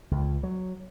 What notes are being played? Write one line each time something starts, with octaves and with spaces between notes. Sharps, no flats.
C#2
F#3